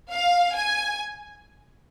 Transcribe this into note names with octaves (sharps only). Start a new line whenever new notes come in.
F5
G#5